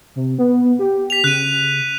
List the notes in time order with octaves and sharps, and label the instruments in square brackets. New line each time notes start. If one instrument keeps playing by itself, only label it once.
[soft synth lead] C3
B3
G4
[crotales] B6 F7
[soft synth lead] C#3 [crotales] F#6 D#7